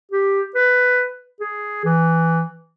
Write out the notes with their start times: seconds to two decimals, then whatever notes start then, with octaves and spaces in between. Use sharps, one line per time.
0.11 G4
0.55 B4
1.40 G#4
1.84 E3